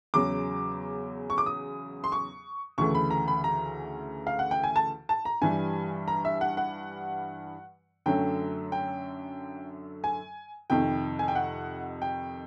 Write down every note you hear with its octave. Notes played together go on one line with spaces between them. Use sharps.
E2 C#3 F#3 D6
C#6
D6
D#6
C6
C#6
D2 C#3 E3 A3 C#6
B5
A#5
B5
A#5
F5
F#5
G5
G#5
A5
A5
A#5
G2 E3 G3 G#5
A#5
E5
F#5
F#5
F#2 D3 F#3 A3 G5
G5
G#5
F2 C3 D#3 G5
G#5
G5
F#5
G5